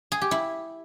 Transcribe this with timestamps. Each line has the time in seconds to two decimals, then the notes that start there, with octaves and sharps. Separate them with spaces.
0.12 G#4
0.21 G4
0.31 E4